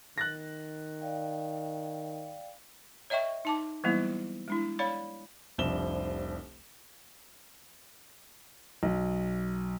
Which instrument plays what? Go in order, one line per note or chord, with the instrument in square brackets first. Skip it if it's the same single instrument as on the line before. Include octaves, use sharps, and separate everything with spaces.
[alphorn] D#3 [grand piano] F#6 A6 A#6
[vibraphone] D5 F5 G5
[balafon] C#5 D#5 E5 G5 C#6
D#4 A5 D6
E3 F#3 G3 A#3 B3 E4
G#3 D4 E4
C#5 D5 F5 B5
[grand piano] F1 C2 F3 D4 E7 G7
B1